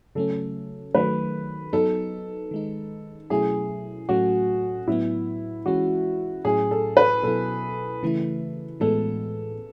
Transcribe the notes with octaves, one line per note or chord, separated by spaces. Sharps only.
C#3 F#3 A3 C#4 A4
D#3 F#3 A3 B4
F#3 B3 D#4 A4
D#3 G#3 D#4
B2 F#3 A3 C#4 E4 G#4
A2 F#3 A3 C#4 F#4
A2 F#3 B3 E4
E3 G#3 C#4 F#4
A2 F#3 C#4 E4 G#4
A4
B4
B2 F#3 B3 E4 A4
C#3 E3 A3 E4
A2 E3 G#3 B3 A4